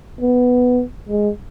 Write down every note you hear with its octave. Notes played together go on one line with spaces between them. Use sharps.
B3
G#3